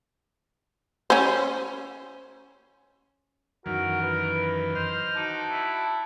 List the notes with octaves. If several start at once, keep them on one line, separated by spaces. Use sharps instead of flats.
C#4 C5
F#2 D#3 E3 F#4 A#4
B4
C5 D#5 F6
D#4 F#4 A5 D6
E4